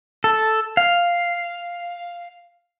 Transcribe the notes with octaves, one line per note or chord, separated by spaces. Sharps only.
A4
F5